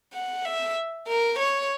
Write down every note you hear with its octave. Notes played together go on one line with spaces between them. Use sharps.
F#5
E5
A#4
C#5